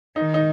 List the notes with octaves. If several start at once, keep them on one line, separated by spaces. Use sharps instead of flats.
D#3 D#4
D#4